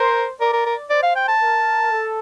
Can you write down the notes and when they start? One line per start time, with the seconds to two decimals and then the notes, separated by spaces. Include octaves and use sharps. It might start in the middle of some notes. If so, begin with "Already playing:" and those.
Already playing: A#4 C5
0.40 A#4 D5
0.53 A#4
0.66 A#4
0.90 C5 D5
1.03 F5
1.16 G5
1.28 A5
1.41 A#4
1.91 A4